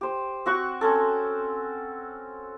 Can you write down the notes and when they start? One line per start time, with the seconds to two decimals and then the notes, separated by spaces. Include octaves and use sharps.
0.01 G4 C5
0.46 C4 F#4 F#5 C#6
0.81 C4 C#4 A4